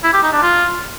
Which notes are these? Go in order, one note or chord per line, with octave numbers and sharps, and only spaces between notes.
E4
G4
D#4
D4
F4